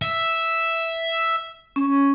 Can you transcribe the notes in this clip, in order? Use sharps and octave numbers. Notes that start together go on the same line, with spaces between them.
E5
C#4 C#6